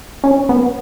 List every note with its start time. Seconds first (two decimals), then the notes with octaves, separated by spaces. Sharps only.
0.24 C#4
0.49 B3